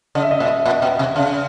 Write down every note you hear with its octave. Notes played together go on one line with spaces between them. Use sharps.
C#3 D#5
E5
D#5
A#2 E5
D#5
A#2 F#5
B2
C3
C#3 F5